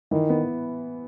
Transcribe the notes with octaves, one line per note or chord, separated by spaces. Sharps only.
D#3 E3
B3